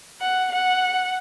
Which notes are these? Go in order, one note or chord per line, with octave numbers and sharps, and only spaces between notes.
F#5
F#5